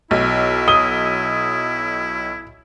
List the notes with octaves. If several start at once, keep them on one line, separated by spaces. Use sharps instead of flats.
B1 E4
D#6 G7